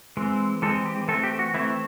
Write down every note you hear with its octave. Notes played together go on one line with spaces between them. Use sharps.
E3 G#3 C4
E3 G#3 C4 A4
G4
E3 A3 C4 A4
G4
F#4
E3 A3 C4 E4